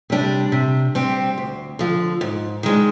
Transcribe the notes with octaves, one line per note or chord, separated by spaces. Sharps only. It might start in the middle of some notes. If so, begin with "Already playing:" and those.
C3 G3 D4
C3
G3 C4 G4
D2
D3 F3
G#2
D#3 G#3 D4